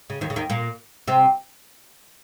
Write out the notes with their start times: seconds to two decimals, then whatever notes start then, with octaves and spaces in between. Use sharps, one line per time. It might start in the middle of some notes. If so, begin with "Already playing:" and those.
0.10 C#3
0.21 D#2 D#3
0.30 C#3
0.36 D#2 D#3
0.50 A#2 A#3
1.08 C3 C4